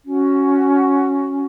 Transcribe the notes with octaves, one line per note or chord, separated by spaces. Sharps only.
C#4 F#4